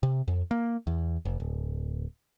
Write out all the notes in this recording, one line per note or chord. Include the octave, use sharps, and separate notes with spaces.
C3
F2
A#3
E2
F1
D1